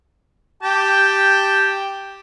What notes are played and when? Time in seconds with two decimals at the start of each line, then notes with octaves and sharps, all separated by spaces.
0.63 G4 G5 A5